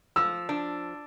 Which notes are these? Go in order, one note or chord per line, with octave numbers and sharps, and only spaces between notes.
F3 E6
D4